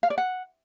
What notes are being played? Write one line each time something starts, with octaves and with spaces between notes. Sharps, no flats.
F5
D5
F#5